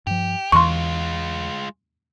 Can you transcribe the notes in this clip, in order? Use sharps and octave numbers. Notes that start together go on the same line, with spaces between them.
G2 F3 G4
E2 E3 G#3 F4 C6 C#6